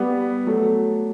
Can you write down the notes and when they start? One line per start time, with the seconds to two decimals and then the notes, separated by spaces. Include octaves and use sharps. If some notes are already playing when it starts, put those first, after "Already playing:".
Already playing: G3 B3
0.47 F#3 A3